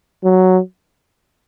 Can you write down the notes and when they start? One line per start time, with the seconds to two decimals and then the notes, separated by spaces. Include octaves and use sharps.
0.24 F#3